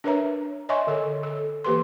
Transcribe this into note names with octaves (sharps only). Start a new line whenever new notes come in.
D4 A#4 B4 C#5 E5 A#5
C#5 D#5 E5 G#5 C6 C#6
D3 A4 C#5
A4
E3 A#3 G4 B4 C6